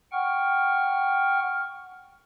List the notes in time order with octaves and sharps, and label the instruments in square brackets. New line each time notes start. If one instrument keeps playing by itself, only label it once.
[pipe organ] F#5 G5 C#6 F6